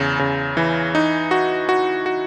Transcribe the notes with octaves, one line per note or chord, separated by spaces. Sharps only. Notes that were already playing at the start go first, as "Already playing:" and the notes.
Already playing: E2 C#3
C#3
E3
D#4
F#4
F#4
F#4